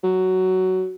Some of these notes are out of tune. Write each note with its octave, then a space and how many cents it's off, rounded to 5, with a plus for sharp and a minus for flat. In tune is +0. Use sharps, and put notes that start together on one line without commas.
F#3 +10